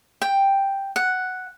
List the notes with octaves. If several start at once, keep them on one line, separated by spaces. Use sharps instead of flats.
G5
F#5